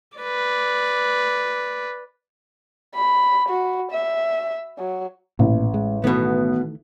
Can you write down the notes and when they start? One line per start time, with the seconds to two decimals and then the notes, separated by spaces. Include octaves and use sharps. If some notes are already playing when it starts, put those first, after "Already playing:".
0.18 B4 D5
2.95 B5
3.48 F#4
3.91 E5
4.78 F#3
5.39 A1 A#2
5.74 G#3
6.04 B2 D#3 E3 A3 B3